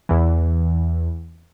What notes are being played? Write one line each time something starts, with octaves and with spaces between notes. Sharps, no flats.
E2 E3